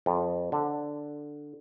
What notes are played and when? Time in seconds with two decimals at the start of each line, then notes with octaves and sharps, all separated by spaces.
0.06 F2
0.52 D3